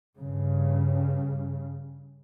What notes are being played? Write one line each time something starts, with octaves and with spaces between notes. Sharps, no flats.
G2 C#3